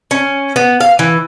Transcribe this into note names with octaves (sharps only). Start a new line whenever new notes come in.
C#4
B3
F5
E3